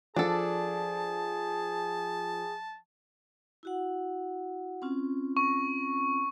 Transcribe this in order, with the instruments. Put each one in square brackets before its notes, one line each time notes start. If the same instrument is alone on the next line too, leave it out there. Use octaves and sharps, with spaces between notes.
[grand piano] F3 [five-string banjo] D4 A4 [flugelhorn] G#4 [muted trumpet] A5
[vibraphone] E4 F#4 F#5
C4 C#4 F4
[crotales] C#6